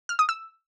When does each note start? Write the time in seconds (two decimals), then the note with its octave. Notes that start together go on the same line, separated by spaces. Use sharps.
0.09 F6
0.19 D#6
0.29 E6